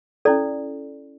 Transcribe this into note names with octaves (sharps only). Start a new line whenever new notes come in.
C#4 E4 A4 D5